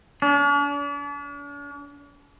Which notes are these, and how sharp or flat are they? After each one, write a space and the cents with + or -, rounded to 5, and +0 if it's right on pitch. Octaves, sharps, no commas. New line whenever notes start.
D4 -45